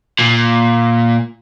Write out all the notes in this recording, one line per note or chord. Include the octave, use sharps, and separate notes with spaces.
A#2